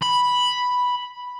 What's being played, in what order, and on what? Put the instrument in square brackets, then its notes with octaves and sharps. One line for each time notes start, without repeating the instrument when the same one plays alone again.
[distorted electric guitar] B5